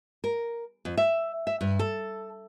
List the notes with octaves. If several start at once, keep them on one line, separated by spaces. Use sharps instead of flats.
A#4
F2
E5
E5
G2
A4